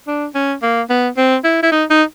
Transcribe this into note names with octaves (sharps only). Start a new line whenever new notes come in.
D4
C#4
A#3
B3
C4
E4
E4
D#4
D#4